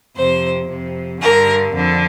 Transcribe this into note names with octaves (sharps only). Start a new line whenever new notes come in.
F2 C3 C5
F2 C3
G2 D3 A#4
F2 D3